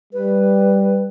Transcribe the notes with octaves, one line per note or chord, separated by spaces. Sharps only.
G3 B4